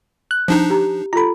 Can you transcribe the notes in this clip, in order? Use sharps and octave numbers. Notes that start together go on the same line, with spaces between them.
F#6
F3 D4 D#4
G4 A#5
F4 A4 A#5 B5